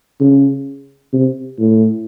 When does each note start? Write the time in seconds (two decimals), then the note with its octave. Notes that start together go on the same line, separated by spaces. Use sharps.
0.21 C#3
1.13 C3
1.59 A2